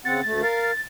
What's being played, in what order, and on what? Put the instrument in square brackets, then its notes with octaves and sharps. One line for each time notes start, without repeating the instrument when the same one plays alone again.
[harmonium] C#3 C4 F#5 [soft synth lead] A6
[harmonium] D2 A3
A#4 F5